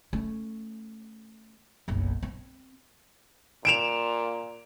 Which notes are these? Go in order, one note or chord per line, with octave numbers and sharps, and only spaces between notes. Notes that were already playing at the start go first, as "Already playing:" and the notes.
A3 C#4
F#1 B1
C4
A#2 D7 E7 F7